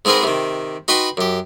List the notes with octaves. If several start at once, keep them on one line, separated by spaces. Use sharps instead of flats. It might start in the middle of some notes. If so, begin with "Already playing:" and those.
G#2 G#3 C4 G#4 A#4 B4
C3 D#3
D#4 F#4 B4 G5 B5 C6
F#2 G4